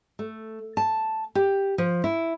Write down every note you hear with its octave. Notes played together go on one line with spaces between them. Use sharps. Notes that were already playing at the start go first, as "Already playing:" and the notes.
A3
A5
G4
F3
E4